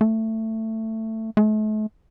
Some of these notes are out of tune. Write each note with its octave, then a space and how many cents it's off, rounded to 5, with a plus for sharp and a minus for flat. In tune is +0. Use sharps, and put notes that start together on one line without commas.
A3 +15
A3 -40